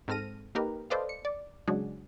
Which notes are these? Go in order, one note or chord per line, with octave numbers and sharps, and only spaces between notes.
G#2 C4 A4 F6 A#6 D#7
A#3 D#4 G4 A#4 B4
A4 B4 C5 D5 D#5 F5
C#7
D5
C#3 F#3 G#3 D4 F#4 G#4